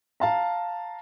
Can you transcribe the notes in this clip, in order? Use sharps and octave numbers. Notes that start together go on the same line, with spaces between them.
F5 A5 A#5